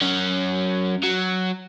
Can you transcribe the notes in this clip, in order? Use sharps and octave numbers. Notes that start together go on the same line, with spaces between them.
F#3 C#4
F#3